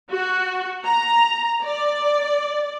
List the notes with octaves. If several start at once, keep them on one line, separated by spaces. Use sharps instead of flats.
F#4
A#5
D5